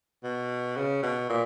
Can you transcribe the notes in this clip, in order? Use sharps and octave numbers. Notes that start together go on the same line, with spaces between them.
B2
C#3
B2
A#2